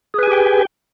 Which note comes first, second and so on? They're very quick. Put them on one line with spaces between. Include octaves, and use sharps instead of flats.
G#4 B4 G#5 G4 G5